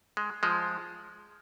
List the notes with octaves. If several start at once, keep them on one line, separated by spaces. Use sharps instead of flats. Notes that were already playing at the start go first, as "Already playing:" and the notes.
G#3
F3 G#3